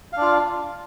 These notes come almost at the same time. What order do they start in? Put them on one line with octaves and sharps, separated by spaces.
F5 D4 F4